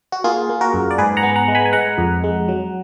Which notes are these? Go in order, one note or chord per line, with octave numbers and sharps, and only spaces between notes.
F#4
A#3 F4 G#4
A#3
F#4 A#4
F#2
D5
G#2 G#4 B4
F#5 A#5
B3
F#5 A#5
G#3
G#5 B5
G#5
G#3 F#5 A#5
F2
G#3
F#3